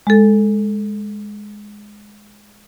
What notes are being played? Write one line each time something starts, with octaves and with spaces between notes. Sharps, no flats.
G#3 A4